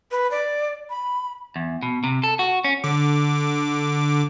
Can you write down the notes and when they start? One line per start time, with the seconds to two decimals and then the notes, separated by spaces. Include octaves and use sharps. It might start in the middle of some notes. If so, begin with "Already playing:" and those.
0.11 B4
0.31 D5
0.90 B5
1.56 E2
1.83 B2
2.04 C3
2.23 A4
2.39 F#4
2.64 C#4
2.84 D3 D6